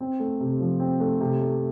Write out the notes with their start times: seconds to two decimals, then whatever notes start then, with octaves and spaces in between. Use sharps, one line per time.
0.01 C4
0.20 A3
0.40 C3
0.60 F3
0.80 C4
1.00 A3
1.21 C3
1.41 A3